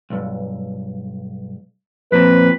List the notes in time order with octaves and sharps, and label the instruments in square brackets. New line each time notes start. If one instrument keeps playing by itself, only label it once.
[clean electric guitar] B1 G2
[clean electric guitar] F2 A#2 C4 [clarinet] B4